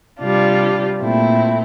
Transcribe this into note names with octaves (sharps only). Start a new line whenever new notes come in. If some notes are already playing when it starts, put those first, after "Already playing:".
C3 G3 D4 F4
A#2 A3 C4 E4